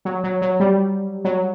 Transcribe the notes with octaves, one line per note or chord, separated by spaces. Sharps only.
F#3
F#3
F#3
G3
F#3